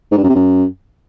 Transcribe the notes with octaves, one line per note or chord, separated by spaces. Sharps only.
G#2
G2
F#2
C3
F#2